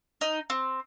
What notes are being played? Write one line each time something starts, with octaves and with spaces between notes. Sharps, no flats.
D#4
C4